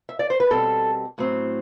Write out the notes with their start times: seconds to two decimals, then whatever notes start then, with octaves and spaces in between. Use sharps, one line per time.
0.09 E5
0.19 D5
0.30 C5
0.40 B4
0.50 B2 G3 C4 A4
1.18 A2 F#3 C4